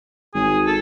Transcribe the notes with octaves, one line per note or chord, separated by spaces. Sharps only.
G#1 G#4
A4